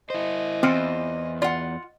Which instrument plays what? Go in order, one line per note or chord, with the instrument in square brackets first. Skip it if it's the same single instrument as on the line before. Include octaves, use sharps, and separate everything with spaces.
[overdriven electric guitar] E4 C5 [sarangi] D#5
[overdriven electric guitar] E2 [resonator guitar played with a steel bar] E3 F4 C5 [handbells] C4 F6 C#7
[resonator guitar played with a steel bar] F4 F#5 [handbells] D5